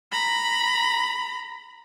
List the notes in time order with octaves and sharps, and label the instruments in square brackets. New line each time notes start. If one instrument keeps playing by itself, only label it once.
[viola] A#5 B5